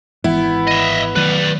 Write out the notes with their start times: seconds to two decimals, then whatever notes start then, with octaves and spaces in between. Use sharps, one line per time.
0.24 G#1 E3 G#3 B3 E4
0.67 D#5 E5
1.16 D#3 F#3 A3 B4 D5